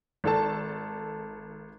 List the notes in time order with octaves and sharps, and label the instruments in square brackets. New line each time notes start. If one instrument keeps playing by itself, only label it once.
[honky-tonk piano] G#1 A4 A5